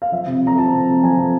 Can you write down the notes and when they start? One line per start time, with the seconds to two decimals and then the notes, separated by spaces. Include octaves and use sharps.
0.02 F5
0.12 F3 E5
0.27 C3
0.42 C3 A#5
0.57 F3 A5
0.73 C3
0.88 C3
1.03 F3 G#5
1.18 C3